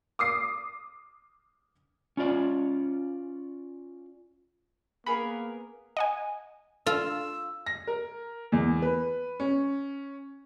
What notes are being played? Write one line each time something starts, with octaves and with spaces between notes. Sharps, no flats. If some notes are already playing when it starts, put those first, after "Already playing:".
D6 D#6 C7
C#4 F4 D5
A#3 B3 G#4 A#4 B5
D#5 F#5 G#5
F4 A4 E6
A#6
A#4
E2
B4
C#4